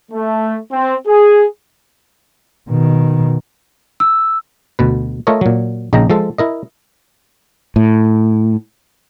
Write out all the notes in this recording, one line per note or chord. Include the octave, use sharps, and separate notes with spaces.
A3
C4
G#4
B2 D#3
E6
D2 B2 B4
A3 F4 A4 A#4 C#5 D#5
A#2 F#3
A#1 C#3 D#4 D#5 G5 A#5
F3 G#3 A4
E4 A#4 D#5
A2